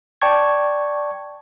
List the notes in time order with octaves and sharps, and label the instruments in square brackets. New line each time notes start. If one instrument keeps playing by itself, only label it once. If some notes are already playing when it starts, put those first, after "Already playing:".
[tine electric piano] D5 G5 A5 C#6 G#6